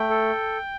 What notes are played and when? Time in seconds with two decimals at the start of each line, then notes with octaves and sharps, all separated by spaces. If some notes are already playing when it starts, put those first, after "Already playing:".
Already playing: A3 G5
0.10 A4